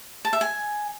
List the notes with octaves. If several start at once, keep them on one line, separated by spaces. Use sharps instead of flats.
A5
E5
G#5